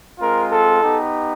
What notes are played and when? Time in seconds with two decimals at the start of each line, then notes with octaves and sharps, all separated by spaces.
0.19 G#3 C4 F4 A#4
0.50 A4
0.82 B3 D#4 G4